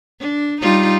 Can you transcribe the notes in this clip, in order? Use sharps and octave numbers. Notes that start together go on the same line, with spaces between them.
D4
G3 D#4 F4